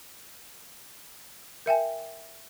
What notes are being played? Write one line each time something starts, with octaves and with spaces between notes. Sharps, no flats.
A#4 E5 G5 G#5